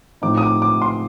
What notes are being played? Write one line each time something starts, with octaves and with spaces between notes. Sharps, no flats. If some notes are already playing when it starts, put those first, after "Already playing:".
A2 F3 C4 D#4 D6
D#6
D6
D6
C6